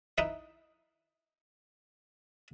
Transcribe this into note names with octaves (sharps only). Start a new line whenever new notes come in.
D#4 E4 B4 E5